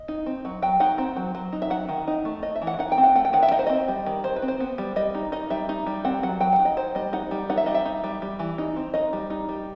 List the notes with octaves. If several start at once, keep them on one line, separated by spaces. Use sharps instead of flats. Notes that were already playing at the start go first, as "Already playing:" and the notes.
Already playing: D#5
D#4
C4
F#3
F#3 G5
D#4 F#5
C4
F#3
F#3
D#4
E5
F#3 F#5
D#3
D#4
A3
A3 D#5
E5
E3
F#5
D#4 F#5
G5
C4
F#5
A3 F#5
G5
D#3 F#5
E5
D#4 D#5
C5
C4 D#5
G3
D#3
D#3 C5
B4
C4
C5
B3
G3
G3 D#5
D#4
D#4 D#5
G3 E5
D#4
G3
C4 F#5
F#3 F#5
F#3 G5
F#5
D#4
D#5
D#4 C5
G3 D#5
D#4 F#5
G3
D#4 F#5
E5
G3 D#5
E5
D#4
G3
G3
E3
D#4
C4
D#4 D#5
G3
D#4
G3